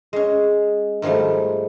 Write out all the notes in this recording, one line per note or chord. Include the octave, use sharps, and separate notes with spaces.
G#3 C#4
G#2 D#3 F3 G3 A3